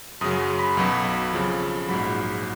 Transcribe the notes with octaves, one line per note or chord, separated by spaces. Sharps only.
F#2 C#3 F#3 D#6
B5
B1 B2 F#3
F2 C#3 F3
A#1 G#2 F#3 B5